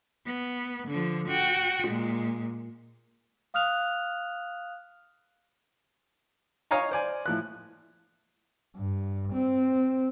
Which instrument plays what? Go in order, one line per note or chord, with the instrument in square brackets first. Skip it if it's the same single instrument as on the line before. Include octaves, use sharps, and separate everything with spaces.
[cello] B3
D3 F3
F#4 G5
A#2 G#3
[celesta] F5 D#6 F6 F#6 F7
[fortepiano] C#5 D#5 F5 G#5 A#5 C#6
C5 D5 G#5
A2 F3 F#6
[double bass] G2
C4